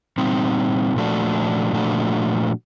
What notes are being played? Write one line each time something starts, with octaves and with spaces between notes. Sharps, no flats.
A#2 G3 C4 D#4
A#2 F3 A3 D4 F#4
A#2 F3 A3 D4 F#4